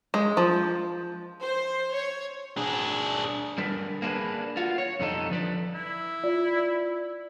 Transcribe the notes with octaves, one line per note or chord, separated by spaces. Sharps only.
G#3
F3
C5
C#5
D4 G#4
D3 G3 D4 A#4 B4
A#3 C4 D4 F4 G#4 B4
F4 F#4
C#5
F2 D3 G3 D#4 A4
F3 B4 D5
E4
F4 D5